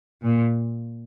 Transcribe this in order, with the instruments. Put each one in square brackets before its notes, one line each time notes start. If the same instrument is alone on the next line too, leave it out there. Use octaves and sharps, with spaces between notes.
[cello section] A#2